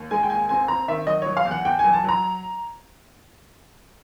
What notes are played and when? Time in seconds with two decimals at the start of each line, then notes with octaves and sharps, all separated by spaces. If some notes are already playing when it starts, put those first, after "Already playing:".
Already playing: D#2
0.11 G#3 G#5
0.23 G5
0.30 D#2 G#5
0.49 C4 G#5
0.68 C4 A#5
0.88 D#3 E5
1.07 F#3 D#5
1.22 F#3 C#5
1.37 F5
1.45 E2
1.51 F#5
1.65 E2 G5
1.79 G#5
1.85 F#3
1.93 A5
2.04 F#3 A#5